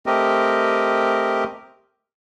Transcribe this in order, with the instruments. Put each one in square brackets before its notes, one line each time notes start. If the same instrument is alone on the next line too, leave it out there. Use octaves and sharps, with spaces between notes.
[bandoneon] A3 C4 G4 A#4 D#5